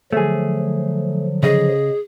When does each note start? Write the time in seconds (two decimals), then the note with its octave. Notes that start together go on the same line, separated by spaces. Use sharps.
0.13 D3 F3 F#3 A3 G#4
1.43 C#3 G#4 D#5